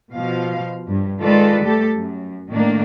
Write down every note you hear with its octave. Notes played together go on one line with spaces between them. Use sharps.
B2 F3 F5
G2
D#3 G#3 F4 A4 B4 D5
G3 A3 G4 A4
F#2
A2 D#3 A3 A#3 D4